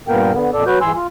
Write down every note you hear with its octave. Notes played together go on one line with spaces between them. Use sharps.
G2 A#2 A#3 B3 A#4 G5
D3 B3
F2 A#2 A4 D5
F#3 F#4 B4 G6
G#2 E3 G#5 C6 E6
F4